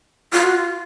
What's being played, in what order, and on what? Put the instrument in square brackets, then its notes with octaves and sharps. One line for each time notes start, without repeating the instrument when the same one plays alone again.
[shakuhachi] F4
F#4
F4